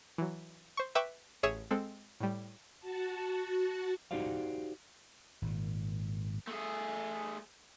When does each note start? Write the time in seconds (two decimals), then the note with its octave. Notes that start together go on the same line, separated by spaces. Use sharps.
0.18 E3 F#3
0.77 C5 C#6
0.95 B4 E5 G5 B5 C#6 D6
1.43 A1 G#4 C#5 E5 D#6 E7
1.71 G#3 C4 A4
2.20 A2 G3
2.80 F#4 A5
4.11 D#4 F#4 G4 C5 D5 F5
5.42 G#1 A#2
6.47 A3 G#4